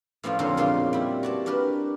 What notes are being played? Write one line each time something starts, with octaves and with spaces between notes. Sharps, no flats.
A2 F3 C#4 F4 D5
F2 A#2 D3 F#3 C#4 C5
A#2 C#3 G#3 F4 D5 C6
G3 E4
F#4 D5 A5
D4 G4 A#4 B4